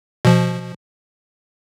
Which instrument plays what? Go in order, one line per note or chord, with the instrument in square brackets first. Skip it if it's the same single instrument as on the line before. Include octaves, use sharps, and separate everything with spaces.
[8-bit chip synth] B2 F3